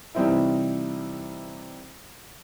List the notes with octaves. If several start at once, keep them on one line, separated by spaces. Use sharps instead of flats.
C3 E3 G3 C4 D#4 E4